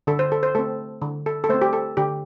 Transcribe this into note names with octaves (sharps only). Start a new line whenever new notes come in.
D3 A4
C5
A4
C5
A3 C4 A4
D3
A4
A4
A3 C4 C5
G4
A4
D3 G4